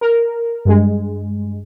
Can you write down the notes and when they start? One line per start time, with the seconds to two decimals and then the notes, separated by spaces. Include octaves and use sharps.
0.01 A#4
0.65 G2 G#3